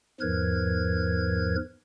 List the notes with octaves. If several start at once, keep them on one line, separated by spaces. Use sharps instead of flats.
E2 G#2 F3 A#4 B4 G#6